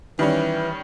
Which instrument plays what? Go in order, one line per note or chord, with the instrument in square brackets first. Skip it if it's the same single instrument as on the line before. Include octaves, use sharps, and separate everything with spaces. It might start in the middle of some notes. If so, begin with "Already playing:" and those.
[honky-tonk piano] D#3 G3 C#4 [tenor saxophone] E3